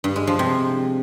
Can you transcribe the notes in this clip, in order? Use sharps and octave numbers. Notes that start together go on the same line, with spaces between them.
G2
G#3
F3
C3